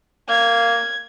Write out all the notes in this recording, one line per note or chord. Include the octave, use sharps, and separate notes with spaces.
A#3 G#6